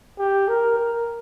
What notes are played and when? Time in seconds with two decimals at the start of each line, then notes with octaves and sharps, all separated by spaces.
0.19 G4
0.48 A#4
0.79 A#4